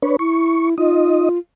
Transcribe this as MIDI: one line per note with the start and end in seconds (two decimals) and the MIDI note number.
0.03 0.17 62
0.03 0.17 71
0.03 0.17 73
0.19 0.75 64
0.19 0.69 85
0.78 1.29 63
0.78 1.38 65
0.78 1.29 75